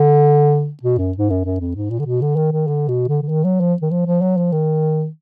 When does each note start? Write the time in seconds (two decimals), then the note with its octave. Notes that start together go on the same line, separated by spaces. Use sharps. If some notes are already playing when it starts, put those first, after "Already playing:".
Already playing: D3
0.83 B2
0.98 F#2
1.18 G#2
1.30 F#2
1.45 F#2
1.60 F2
1.76 G#2
1.91 A#2
1.99 D3
2.06 B2
2.22 D3
2.36 D#3
2.52 D#3
2.67 D3
2.88 B2
3.09 D3
3.22 D3
3.29 D#3
3.44 F#3
3.60 F3
3.82 D#3
3.91 F3
4.06 F3
4.22 F#3
4.37 F3
4.52 D#3